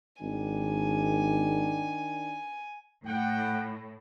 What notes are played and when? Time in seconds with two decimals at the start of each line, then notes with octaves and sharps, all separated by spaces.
0.22 G#1 D#3 D4 G#5
3.06 A2 F#5 G5